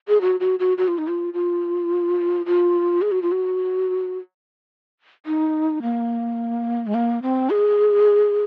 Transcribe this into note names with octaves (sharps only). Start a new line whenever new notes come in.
G#4
F#4
F#4
F#4
F#4
F4
D#4
F4
F4
F4
G#4
F#4
F4
F#4
D#4
A#3
G#3
A#3
C4
G#4